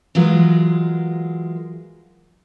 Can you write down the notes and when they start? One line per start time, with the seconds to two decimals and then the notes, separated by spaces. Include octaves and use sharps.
0.15 E3 F#3 G#3 F4 G#4 A#4